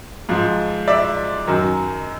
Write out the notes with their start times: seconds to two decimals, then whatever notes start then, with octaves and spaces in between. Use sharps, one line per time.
0.29 G#2 F3
0.88 D5 E5
1.47 F#2 D#3 F#3